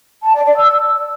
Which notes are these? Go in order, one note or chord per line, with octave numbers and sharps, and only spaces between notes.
A5
D5
D5
E6